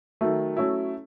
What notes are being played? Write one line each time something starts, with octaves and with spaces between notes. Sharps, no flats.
D#3 F#3 A3
F#3 A3 C#4 E4